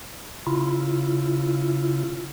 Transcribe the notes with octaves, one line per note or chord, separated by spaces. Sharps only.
C#3 E4 F4